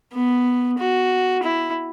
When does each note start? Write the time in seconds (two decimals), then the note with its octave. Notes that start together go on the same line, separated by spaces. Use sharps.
0.13 B3
0.78 F#4
1.43 E4